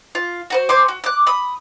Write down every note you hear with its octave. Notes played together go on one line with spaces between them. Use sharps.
F4
F#4 B4 C5
C5 G#5 C6 D6
F#4
D6 F#6
B5 D#6